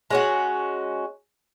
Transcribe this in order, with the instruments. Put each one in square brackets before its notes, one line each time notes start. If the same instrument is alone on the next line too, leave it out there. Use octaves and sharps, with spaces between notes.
[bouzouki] G#3 C#4 F#4